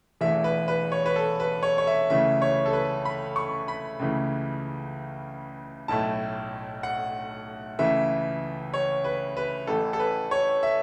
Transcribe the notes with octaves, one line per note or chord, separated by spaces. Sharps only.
E1 E2 E3 A3 E5
B4
B4
C#5
B4
A4
B4
C#5
C#5
E5
C#2 C#3 E3 A3 E5
C#5
A4
B4
B5
C#6
B5
C#2 C#3 E3 A3
B1 A2 A3 A5
F#5
C#2 C#3 E3 A3 E5
C#5
B4
B4
A1 A2 E3 A3 A4
A4
B4
C#5
E5